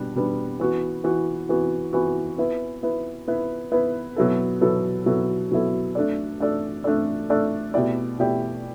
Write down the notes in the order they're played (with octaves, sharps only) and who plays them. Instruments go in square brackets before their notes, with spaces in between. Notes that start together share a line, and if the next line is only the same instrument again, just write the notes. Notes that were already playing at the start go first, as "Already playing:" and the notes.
Already playing: [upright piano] B2 G3 B3 D4
B2 G3 B3 D4
E3 B3 F#4
E3 B3 F#4
E3 B3 F#4
E3 B3 F#4
B3 E4 B4
B3 E4 B4
B3 E4 B4
B3 E4 B4
B2 F#3 B3 E4 A4
B2 F#3 B3 E4 A4
B2 F#3 B3 E4 A4
B2 F#3 B3 E4 A4
A3 D4 A4 D5
A3 D4 A4 D5
A3 D4 A4 D5
A3 D4 A4 D5
B2 A3 E4 G4 D5
B2 A3 E4 G4 D5